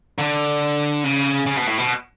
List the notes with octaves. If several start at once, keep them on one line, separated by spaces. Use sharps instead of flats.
D3
C#3
C#3
B2
A2
B2